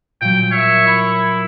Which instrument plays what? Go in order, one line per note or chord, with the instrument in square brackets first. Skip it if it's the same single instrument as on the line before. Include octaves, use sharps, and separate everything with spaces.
[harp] A#2 F#3 [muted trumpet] G5
[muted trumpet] C#5 [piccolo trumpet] E5
[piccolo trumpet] E4